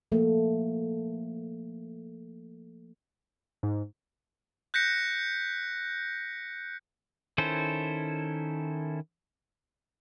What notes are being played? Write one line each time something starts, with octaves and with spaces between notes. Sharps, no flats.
F3 A3 A#3
G#2
F#6 G6 A#6 B6 C#7
D#3 C#4 E4 A4 C5